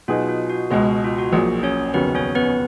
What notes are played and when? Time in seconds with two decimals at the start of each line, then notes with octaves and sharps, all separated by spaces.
0.08 B2 F#3 B3 D#4 F4 G#4
0.29 F4
0.50 F#4
0.70 C#2 B2 G#3
1.04 F4
1.18 F#4
1.32 A#1 A#2 F#3 G#4
1.63 C#4 C#5
1.94 F1 D#2 C#3 F#3 B3 B4
2.15 C#4 C#5
2.35 B3 B4